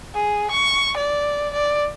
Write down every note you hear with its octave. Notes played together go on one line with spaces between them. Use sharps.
G#4
C#6
D5
D5